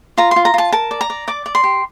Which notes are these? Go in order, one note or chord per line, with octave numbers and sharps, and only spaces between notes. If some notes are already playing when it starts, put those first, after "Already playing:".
F4 A#5
F4 C6
A#5
F4 A5
A#4 A5
D5
A#5
D5
D5 D6
D5
C6
G4